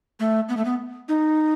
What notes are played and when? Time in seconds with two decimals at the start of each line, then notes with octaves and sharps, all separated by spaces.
0.20 A3
0.49 B3
0.57 A3
0.65 B3
1.09 D#4